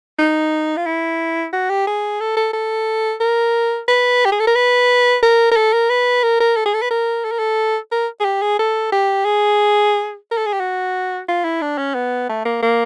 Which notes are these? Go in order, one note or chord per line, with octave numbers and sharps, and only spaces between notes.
D#4
F4
E4
F#4
G4
G#4
A4
A4
A4
A#4
B4
G4
G#4
A4
A#4
B4
A#4
A#4
A4
A#4
B4
A#4
A#4
A4
G#4
A4
B4
A#4
A4
A#4
A4
A#4
G#4
G4
G#4
A4
G4
G#4
A#4
A4
G#4
G4
F#4
F4
E4
D4
C#4
B3
A3
A#3
A#3